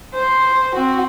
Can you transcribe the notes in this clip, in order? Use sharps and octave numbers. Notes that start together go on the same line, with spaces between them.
C5
C4 F#4